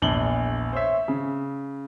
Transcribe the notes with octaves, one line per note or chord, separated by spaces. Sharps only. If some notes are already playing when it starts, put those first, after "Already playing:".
A#1 E2 D4 F#7 G7
C5 C#5 E5
C#3